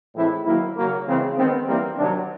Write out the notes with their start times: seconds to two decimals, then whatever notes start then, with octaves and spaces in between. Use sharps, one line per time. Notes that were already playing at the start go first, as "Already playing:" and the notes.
0.13 A2 E3 G#3 C4 E4
0.43 D#3 F#3 A#3 E4
0.73 C#3 F#3 A#3
1.04 C#3 E3 G#3 C4
1.35 D#3 G#3 B3 C4
1.65 E3 G3 A#3 C4
1.96 C3 D#3 F#3 D4